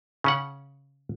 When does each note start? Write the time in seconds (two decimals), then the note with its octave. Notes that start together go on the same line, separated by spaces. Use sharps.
0.24 C#3 C#4 F#5